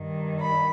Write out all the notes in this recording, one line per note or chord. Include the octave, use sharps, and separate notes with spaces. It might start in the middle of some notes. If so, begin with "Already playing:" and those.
Already playing: G2 D#3
B5